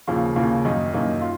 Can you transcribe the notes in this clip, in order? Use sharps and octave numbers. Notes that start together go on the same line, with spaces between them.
D#2 C#3 F3 A#3
D#2 C#3 F3 A#3
F#2 D#3 A#3 D#4
F#2 D#3 A#3 D#4
F4